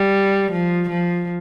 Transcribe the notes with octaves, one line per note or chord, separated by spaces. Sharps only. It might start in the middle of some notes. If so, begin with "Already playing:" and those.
Already playing: G3
F3
F3